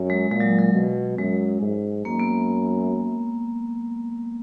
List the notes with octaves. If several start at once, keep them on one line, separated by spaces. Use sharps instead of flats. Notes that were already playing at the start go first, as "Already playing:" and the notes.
Already playing: F#2
G#3
A#2 G#3
F#3
F#3
B2
F#2 G#3
G#2
F#2 A#3
B3